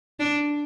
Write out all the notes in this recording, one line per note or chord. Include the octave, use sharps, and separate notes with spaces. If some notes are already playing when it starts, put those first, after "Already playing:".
D4